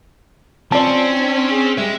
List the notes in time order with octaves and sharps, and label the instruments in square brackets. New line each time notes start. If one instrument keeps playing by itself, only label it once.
[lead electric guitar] C4 [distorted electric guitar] C#4 [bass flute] F4 [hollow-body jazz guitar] D5 A5
[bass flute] D4
G#4
[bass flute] G3 [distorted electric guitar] G#3 [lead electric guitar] E5